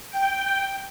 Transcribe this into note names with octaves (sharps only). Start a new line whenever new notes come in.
G5